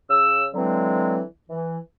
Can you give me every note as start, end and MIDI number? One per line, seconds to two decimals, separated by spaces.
0.09 0.47 49
0.09 0.47 88
0.54 1.21 50
0.54 1.21 52
0.54 1.21 54
0.54 1.21 56
0.54 1.21 60
1.49 1.78 52